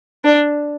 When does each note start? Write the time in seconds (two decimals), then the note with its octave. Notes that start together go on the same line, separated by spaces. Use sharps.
0.25 D4